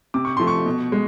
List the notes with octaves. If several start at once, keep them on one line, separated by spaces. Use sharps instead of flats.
C3 D6
C#6
F3 A3 C6
C#6
B2
G#3